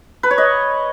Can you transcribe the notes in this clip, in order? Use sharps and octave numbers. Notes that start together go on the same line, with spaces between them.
B4
C#5
D#5